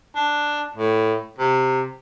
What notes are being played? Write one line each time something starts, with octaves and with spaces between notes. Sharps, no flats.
D4
A2
C3